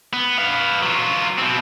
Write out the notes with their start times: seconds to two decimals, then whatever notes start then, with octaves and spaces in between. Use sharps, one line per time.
0.13 B3
0.38 B4 F5
0.83 F#3 F4
1.38 B2 C4